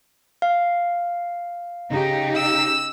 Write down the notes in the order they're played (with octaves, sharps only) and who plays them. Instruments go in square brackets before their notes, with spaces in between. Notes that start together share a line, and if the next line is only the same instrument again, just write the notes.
[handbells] F5
[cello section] C#3 D#4 G4
[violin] E6